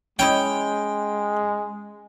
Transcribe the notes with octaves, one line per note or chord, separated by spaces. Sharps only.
G#3 C#4 E4 D#5 G5